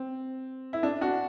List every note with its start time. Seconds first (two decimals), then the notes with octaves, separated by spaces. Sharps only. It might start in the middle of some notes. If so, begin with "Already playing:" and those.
Already playing: C4
0.73 E4
0.83 D4
1.01 D4 F#4